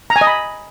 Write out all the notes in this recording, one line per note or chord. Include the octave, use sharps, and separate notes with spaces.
A#5
G#5
D#5
B5